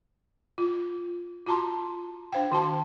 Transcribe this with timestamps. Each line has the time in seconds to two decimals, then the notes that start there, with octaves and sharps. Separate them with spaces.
0.58 F4
1.46 F4 F#4 A5 A#5 C6
2.32 D4 C5 F5 G5
2.52 D#3 F#4 A5 C6